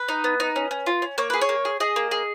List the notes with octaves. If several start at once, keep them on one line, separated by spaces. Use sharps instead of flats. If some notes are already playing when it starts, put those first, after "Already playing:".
Already playing: B4
D#4
B3
D#4
C#4
C#4
F4
C#4
A#3 C#5
G#4 B4
C#5
A#3
G#4
G#4 D#5
A#3
G#4